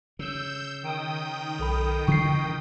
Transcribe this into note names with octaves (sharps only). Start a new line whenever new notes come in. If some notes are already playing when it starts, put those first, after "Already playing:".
C#3 E6 G6
D#3 G5 D#6
B1 A4 B5
C#3 E3 F3 C#6 C7